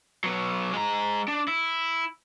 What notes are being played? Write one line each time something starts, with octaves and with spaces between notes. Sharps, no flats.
F#3 B3
G#3 A#5
D4
E4